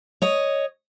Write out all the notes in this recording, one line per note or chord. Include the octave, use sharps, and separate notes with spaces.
C#5 D#5